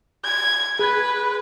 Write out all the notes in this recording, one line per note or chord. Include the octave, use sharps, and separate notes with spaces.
G#6
G#4 B4 G#6